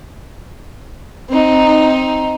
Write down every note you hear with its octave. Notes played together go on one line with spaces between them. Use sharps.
C4 D#4